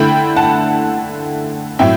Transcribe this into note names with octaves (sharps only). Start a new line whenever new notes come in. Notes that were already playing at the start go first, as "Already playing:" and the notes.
Already playing: D3 A3 E4 G5 B5
F#5 A5
A2 F#3 C4 E4 E5 G5